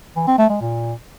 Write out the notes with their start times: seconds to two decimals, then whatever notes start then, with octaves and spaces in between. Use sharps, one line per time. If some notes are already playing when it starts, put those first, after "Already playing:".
0.16 E3
0.27 C4
0.39 A3
0.50 G#3
0.61 A#2